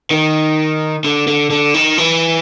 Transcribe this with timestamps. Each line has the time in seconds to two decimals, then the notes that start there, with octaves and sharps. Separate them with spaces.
0.11 D#3
1.04 D3
1.28 D3
1.50 D3
1.74 D#3
1.98 E3